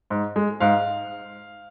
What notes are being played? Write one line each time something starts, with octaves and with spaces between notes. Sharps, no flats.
G#2
G#3
G#2 F5